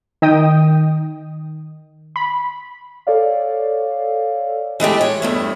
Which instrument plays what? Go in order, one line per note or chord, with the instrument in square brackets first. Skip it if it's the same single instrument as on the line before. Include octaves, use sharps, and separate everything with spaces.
[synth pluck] D#3 D#5 G5 D#6
B5
[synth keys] A4 C#5 D5 F5
[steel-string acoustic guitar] E3 G#3 A3 G4
C#5
E2 G2 A3